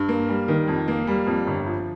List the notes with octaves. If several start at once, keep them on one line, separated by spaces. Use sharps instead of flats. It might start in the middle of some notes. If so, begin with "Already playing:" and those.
Already playing: G2
A#3
G3
D#3
F2
A#3
G3
F2
G1
F3